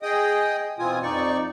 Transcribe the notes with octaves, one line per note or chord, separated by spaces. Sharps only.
G#4 D#5 G5 D#6
B2 E3 C4 F4 G#5 D#6
F2 D#4 D5 C#6